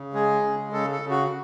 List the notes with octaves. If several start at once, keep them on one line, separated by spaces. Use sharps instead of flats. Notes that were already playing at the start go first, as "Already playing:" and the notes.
Already playing: C#3
G#3 G#4
C#3
C#3 A4
A4
C#3
F#4